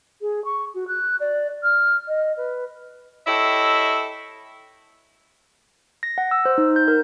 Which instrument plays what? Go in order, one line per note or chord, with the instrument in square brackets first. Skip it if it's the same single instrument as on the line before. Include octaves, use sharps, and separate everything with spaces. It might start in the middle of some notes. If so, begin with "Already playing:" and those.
[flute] G#4
C#6
F#4
F#6
D5
F6
D#5
B4
[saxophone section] E4 G4 A4 C#5 D#5 E5
[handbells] A#6
F#5
E6
C5
D#4
G6
A#4